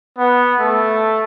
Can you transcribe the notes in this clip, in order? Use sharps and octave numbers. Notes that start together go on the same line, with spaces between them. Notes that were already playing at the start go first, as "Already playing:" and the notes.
B3
A3